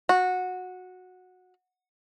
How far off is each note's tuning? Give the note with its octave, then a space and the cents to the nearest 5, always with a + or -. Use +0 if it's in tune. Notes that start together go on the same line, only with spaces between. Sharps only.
F#4 -15